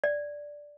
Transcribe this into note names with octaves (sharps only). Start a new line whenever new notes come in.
D5